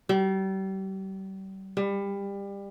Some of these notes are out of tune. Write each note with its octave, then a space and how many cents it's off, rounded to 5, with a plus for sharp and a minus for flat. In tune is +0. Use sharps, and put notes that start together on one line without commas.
G3 -35
G3 +25